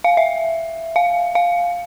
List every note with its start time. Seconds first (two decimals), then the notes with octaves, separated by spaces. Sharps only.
0.04 F5
0.17 E5
0.96 F5
1.35 F5